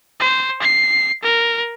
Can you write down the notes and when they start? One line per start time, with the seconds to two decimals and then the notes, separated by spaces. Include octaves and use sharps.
0.20 C5
0.62 C7
1.23 A#4